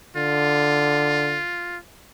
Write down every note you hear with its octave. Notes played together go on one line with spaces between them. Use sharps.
D3 F4